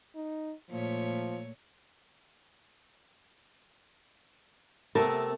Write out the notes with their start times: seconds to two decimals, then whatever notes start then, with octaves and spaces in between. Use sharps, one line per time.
0.15 D#4
0.70 A#2 F3 A3 C#5
4.95 C3 A3 B3 A#4 A5